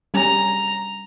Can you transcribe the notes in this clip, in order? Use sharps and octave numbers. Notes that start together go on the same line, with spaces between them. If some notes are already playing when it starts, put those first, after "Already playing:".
G3 C#4 G#5 A#5